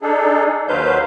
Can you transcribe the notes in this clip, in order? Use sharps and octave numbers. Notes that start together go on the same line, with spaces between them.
D4 D#4 G#4 A4
D#2 F#3 B4 C5 F5 G6